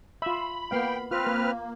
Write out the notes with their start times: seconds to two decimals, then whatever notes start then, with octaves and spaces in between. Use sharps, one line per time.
0.22 F4 E5 B5
0.71 A#3 B3 F5 G5
1.11 C4 F4 B4 F6
1.26 A#3